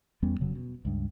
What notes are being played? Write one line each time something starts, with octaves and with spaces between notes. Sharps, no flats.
E2 G3 B3 C#4
F1 C#3 F#3
B2
C#2 G2